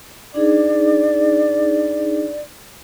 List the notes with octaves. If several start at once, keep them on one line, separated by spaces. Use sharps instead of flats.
D4 D#4 G#4 D5